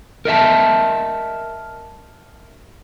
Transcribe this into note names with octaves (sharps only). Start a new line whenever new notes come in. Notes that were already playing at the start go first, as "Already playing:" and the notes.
A#4 D#5 E5 A5